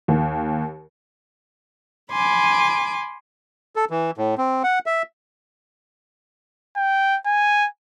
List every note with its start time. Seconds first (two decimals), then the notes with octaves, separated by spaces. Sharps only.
0.08 D#2
2.11 G#5 B5 C6 D6
3.76 A4
3.90 E3
4.18 A2
4.38 C4
4.64 F#5
4.86 E5
6.76 G5
7.26 G#5